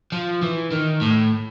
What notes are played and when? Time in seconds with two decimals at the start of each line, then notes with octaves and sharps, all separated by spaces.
0.12 F3
0.42 E3
0.72 D#3
1.01 A2